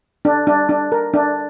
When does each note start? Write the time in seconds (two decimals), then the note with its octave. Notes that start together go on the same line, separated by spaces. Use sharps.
0.25 D4
0.47 D4
0.69 D4
0.92 A#4
1.14 D4